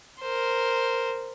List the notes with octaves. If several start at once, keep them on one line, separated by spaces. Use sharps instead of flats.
A#4 C5